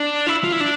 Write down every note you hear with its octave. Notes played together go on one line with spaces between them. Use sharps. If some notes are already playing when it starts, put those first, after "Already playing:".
Already playing: D4
E4
F4
E4
D4